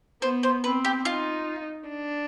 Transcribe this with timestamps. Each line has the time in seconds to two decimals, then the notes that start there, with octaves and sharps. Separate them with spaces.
0.22 B3 C5
0.43 C5
0.64 C4 B4
0.85 G4
1.05 D#4 F4
1.88 D4